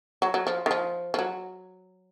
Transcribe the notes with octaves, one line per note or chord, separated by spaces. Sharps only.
F#3
F#3
F3
D#3
F3
F3
F#3